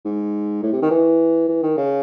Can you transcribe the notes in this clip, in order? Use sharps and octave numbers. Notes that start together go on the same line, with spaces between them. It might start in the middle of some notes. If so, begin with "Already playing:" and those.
G#2
A2
C3
D#3
E3
E3
D#3
C#3